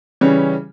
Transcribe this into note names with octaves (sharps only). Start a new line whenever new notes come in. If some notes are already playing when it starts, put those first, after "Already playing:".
C#3 E3 G3 C#4